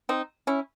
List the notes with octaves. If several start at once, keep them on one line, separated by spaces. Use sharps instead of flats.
C4 D#4
C#4 E4